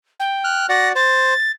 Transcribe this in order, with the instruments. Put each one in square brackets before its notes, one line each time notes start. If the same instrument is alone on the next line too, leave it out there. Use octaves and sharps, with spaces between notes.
[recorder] G5
[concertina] F6 F#6
[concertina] F#4 D5 F#5 [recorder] A#6
[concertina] C5 [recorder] A6